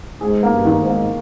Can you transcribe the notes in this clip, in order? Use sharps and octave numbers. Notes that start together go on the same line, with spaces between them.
G#2 G#4
A#3
G2
D#3
G#2
A#3